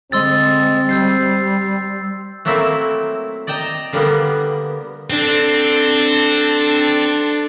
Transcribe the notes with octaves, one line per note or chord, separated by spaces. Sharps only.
D3 G#3 C4 C6 E6 A6
G3 E6 G6 C7
F#3 A3 A#3 C4 E4
D5 D#5 G5 A5 A#5
D3 G3 A#3 B3
C4 D4 A4